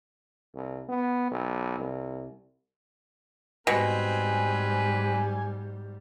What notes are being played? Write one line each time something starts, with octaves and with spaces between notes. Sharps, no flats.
C2
B3
B1
C2
G#2 B2 G3 C4 B4 G#5